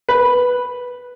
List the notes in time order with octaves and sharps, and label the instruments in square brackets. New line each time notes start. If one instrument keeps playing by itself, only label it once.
[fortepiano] B4